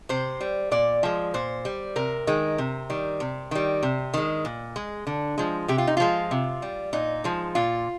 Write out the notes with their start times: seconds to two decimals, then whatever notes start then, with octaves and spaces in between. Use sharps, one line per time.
0.09 C3 C5
0.41 G3
0.71 A#2 D5
1.03 F3 G#3
1.34 A#2 C5
1.65 G3
1.96 C3 A#4
2.27 D#3 G#3
2.58 C3
2.90 D#3 G3
3.20 C3
3.51 D#3 G3
3.83 C3
4.14 D#3 G#3
4.45 A#2
4.76 G#3
5.07 D3
5.38 F3 G#3
5.68 C3 G4
5.78 F4
5.87 D#4
5.97 F3 G#3 F4
6.31 C3
6.62 G3
6.93 A#2 D#4
7.24 F3 G#3
7.55 A#2 F4